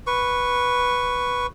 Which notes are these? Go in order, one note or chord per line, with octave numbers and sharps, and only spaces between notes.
B4 C#6